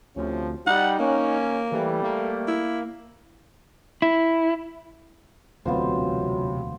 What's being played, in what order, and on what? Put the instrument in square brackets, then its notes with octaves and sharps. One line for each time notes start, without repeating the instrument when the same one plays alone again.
[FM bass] D2 [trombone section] C3 F3 [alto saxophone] C#4
[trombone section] G3 [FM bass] D#4 [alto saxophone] F#5
[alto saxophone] A#3 [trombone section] C#4
[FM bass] E3 [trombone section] G3 A3
[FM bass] A#3
[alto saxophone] E4
[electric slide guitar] E4
[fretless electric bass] E1 D2 [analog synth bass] C3 [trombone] F#3 [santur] B3 F4 C5